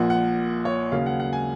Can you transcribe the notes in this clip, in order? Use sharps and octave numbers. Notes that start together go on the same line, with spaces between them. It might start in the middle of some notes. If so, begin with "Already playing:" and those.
Already playing: A#1 A#2 F3 F#5
F#5
C#5
D#2 C#3 F#3 F5
F#5
F#5
G#5